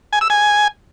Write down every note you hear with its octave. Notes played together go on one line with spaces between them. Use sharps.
G#5
E6
G#5